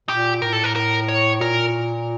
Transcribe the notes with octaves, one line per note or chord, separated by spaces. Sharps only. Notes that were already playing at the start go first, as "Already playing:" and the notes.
A#2 G4
A2 A#4
A4
A#4
A#4
C#5
A#2 A#4